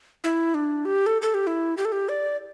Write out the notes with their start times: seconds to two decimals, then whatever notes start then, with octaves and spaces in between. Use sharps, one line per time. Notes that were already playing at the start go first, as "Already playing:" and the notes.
0.24 E4
0.54 D4
0.85 G4
1.06 A4
1.22 A4
1.34 G4
1.47 E4
1.77 G4
1.85 A4
1.92 G4
2.09 D5